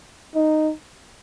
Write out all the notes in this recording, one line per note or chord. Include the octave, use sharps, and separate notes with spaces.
D#4